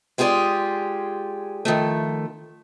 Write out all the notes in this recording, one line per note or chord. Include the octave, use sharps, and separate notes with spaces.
G#3 F4 G4 G#4 D5
D#3 F3 A3